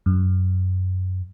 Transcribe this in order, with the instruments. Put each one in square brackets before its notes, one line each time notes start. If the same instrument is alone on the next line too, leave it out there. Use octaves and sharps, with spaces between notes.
[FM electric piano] F#2